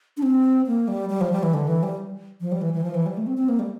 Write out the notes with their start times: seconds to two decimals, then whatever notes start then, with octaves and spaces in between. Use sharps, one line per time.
0.17 D4
0.23 C4
0.67 A#3
0.88 G3
1.10 G3
1.21 F3
1.32 G3
1.43 E3
1.54 D3
1.67 E3
1.83 G3
2.41 F3
2.52 G3
2.62 E3
2.73 E3
2.83 F3
2.94 E3
3.06 G3
3.17 A3
3.27 C4
3.38 C4
3.49 A#3
3.59 G3